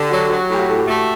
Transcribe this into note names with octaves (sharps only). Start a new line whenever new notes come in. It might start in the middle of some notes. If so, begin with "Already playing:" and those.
Already playing: D3 G4
F#3 F#4
F#3 F#4
A2 G4
F#4
A2 A4
G4
A3 F#4